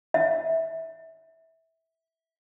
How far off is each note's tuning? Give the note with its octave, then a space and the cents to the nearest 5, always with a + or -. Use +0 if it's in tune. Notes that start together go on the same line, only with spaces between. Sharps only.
E5 -15